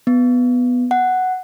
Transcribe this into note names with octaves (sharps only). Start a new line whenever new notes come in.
B3
F#5